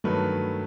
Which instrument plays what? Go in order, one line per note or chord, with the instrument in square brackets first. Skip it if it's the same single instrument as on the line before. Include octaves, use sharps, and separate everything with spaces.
[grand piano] G2 D#3 F#3 A3 B4